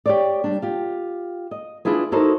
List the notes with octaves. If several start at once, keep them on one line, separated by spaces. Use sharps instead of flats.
G4 C#5 D5
G3 D4
F4 G4
D#5
D4 E4 F4 G#4 B4
D#4 E4 F#4 A4 A#4 C5